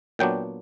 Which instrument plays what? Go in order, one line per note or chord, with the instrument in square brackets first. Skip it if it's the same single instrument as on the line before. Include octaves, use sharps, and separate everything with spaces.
[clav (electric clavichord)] A#2 F#3 B3 D4 G5